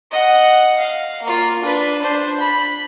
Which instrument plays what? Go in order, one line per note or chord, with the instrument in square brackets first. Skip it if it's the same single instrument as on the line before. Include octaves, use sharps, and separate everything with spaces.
[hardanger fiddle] D#5 F#5
F5
A#3 F4
D4 B4
D4 C5
B5